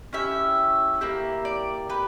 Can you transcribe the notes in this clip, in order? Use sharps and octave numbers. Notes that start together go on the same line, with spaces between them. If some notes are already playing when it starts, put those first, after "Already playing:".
C#4 E4 G4 E5
A#3 E4 G4
D5
G4 B4